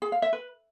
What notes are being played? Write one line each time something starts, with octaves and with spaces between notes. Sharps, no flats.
G#4
F5
E5
B4